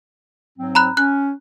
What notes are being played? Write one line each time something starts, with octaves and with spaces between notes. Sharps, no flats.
G#2 F#3 C4
A#5 B5 F#6
C#4 F#6